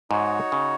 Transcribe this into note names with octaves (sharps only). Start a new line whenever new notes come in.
G#2 D#4 F#4 C#5
C#3